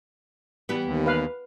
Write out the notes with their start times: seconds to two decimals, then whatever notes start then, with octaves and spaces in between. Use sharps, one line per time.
0.69 E3 G3 B3
0.84 D#2
1.06 B4 F5